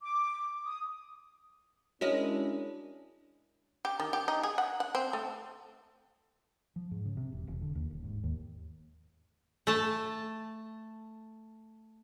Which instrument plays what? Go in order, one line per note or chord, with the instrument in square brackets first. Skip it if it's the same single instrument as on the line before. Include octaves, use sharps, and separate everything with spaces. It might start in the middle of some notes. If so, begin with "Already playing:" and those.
[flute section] D6
D#6
[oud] G#3 A#4 D#5 [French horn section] C#4 D4 E4 [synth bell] F#4 C#5
[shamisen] G4
D#3
G4
D#4
G#4
F#5
F#5
C4
A3
[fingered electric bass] F3
G#2
C#3
C3
E1
E1
D3
D#2
D#1
G#2
D#2
[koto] A3 A5